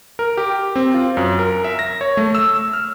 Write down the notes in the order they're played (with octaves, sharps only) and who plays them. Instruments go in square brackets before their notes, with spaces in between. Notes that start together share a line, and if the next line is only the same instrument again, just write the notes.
[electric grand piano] A#4
G4
C4
F4
F#2
A#4
E5
A#6
C#5
A3
E6
F6